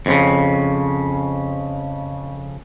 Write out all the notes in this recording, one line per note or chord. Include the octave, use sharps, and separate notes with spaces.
F2 A2 C#3